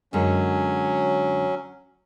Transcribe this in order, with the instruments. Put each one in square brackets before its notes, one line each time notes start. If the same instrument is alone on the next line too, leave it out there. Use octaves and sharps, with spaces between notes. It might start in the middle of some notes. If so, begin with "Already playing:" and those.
[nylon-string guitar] F#2 D3 G#3 [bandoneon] F#3 C#4